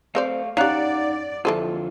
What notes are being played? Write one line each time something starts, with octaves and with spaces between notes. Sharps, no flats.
A3 C4 C5 D5 F5
C#4 D#4 G4 D5 F5 F#5 A#5 F#6
F2 D3 E3 F4 A4 C5